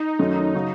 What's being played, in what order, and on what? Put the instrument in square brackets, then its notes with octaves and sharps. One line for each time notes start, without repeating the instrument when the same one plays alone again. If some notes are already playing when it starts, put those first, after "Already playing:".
Already playing: [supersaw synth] D#4
[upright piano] F#2 D#3 F#3 A3
C#3 F#3 C#4 F#4